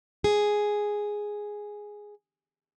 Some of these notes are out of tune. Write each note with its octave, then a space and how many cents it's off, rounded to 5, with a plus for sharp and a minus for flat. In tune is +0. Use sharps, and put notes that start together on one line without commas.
G#4 +0